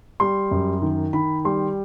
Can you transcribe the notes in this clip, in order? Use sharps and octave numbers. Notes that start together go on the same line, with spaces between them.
G3 C6
F#2
D#3
D#3 B5
G3 C6